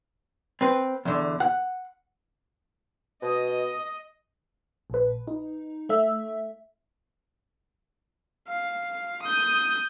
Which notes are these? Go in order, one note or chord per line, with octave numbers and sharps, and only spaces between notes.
C4 B4
E2 D3
F#5
B2 D#5
A#1 B4
D#4
A3 E5
F5
D#6 G6